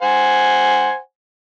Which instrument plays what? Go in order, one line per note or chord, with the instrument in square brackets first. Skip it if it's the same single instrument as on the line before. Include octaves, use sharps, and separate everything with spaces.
[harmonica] C5 F#5 G#5